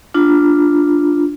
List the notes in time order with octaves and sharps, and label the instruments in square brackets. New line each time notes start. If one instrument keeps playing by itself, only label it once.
[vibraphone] D4 F4